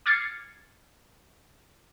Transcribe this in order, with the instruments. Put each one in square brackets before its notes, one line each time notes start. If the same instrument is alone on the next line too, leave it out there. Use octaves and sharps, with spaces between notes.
[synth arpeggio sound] D6 F6 G#6 A6 C7 C#7